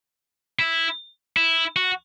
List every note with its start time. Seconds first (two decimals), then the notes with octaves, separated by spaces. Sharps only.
0.59 E4
1.37 E4
1.76 F#4